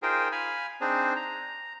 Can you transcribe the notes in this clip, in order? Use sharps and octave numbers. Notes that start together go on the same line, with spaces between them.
D#4 F4 G#4 A#4 C5 G5
F5 G#5 B5
C4 D4 D#4 G#4 C5
A#5